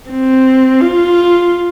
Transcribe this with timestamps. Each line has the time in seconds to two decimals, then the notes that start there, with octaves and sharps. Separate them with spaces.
0.10 C4
0.81 F4